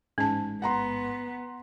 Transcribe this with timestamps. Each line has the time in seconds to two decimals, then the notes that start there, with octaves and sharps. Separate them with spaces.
0.18 A1 G#2 C#4 A5
0.62 B3 F#5 A#5 C6